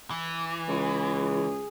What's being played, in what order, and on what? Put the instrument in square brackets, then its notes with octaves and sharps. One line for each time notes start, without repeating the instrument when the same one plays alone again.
[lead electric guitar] E3
[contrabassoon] C#2 [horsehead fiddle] G#4